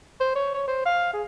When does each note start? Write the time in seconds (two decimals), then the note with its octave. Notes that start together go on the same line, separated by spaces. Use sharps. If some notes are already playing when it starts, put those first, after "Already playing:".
0.20 C5
0.35 C#5
0.54 C#5
0.68 C5
0.86 F5
1.13 G#4